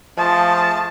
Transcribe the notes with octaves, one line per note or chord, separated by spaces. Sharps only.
F3 A3 F4 G#4 A5